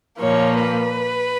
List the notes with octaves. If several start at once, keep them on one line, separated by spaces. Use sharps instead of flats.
A#2 F3 A#3 C#5
B4